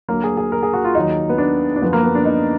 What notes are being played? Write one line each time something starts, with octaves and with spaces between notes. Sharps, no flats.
D2 D3 F#3 A#3
G#4
G#4
A#4
G#4
F#4
F4
D#2 D#3 F#3 D#4
B3
D4
D4
F#2 D3 F3 B3
A#3
B3
D4
D#4